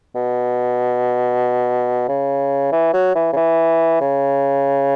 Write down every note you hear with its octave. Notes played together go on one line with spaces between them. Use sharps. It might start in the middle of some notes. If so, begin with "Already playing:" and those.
B2
C#3
E3
F#3
E3
C#3
E3
C#3